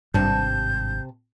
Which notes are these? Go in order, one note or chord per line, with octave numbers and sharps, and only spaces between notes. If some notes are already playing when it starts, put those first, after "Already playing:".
G#1 G2 C3 A5 G6